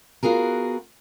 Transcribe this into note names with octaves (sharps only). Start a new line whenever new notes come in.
B3 F4 F#4 G#4 A#4